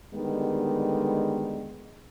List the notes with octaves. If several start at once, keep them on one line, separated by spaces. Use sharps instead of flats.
D3 D#3 G3 G#3 B3